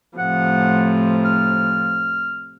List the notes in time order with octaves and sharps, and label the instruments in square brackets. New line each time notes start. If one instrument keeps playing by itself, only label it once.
[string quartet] A2 C3 F3 [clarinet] F#5
[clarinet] F6